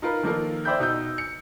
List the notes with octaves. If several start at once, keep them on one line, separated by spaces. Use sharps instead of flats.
D#4 F4 A#4 B4
D#3 F3 A#3 F4 A4 A#4
C5 D5 E5 G5 B5 G6
B2 D#4 E6 G6
C#7